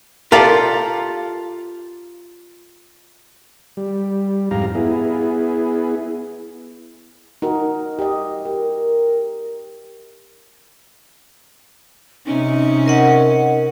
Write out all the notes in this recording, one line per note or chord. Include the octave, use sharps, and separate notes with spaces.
F4 G4 A4 A#4 D5 F5
G3
F2 G#2 G4 F5 A#5
B3 E4 G#4
D#4 F#4 A#4
G4 D#5
G4 A#4
C3 C#4 D#4
A#4 D#5 F#5